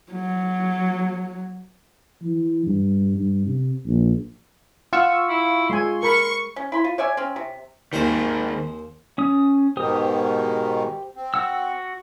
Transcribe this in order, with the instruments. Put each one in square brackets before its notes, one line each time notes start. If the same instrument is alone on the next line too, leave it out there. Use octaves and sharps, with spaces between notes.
[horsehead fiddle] F#3
[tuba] E3
G2
G2
C3
A#1
[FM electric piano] F4 C#6 E6 [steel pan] F#5
[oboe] E4
[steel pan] G#3 G#5 [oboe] C6
[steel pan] A#4 B5 [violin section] C#6
[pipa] C#4
E4 B5 C6
F4
C#5 D5 E5 G#5
C4 C#4
C3
[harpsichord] D#2 G#4 C5 [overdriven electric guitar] D#3 C4
[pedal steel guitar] C#4 D#6
[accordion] G#2 B2 D#3 [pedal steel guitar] G4 C5 D#6
[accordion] C4
[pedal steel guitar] F#4 F#5 E6